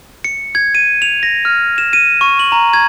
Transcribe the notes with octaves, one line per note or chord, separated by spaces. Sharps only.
C#7
G#6
D#7
F7
A#6
F6
E7
D#7
C#6
F#7
A#5
G#6